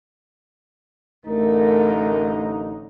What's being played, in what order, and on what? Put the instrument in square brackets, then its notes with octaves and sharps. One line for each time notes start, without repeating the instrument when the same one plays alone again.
[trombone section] A1 D3 D#4 [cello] A3 [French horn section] A#4